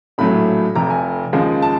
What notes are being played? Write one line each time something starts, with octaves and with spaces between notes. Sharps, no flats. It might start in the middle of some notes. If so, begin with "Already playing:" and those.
A#1 A2 F#3 A3 B5
F1 F2 C3 A#5
G#5
D#2 C#3 F3 G#3
A5